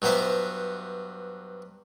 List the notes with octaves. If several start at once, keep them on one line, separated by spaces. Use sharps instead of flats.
G2 F#3 B3 C5 E5